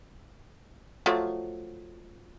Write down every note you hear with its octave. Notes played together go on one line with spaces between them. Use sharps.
F3 F#3 A3